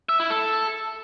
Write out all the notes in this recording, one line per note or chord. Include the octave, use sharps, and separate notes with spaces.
E5
E4
A4